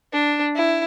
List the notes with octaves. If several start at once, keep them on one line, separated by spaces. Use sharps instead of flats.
D4
E4